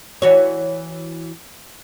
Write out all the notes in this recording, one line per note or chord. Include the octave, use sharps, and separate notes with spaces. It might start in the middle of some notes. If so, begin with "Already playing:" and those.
E3 F#4 C#5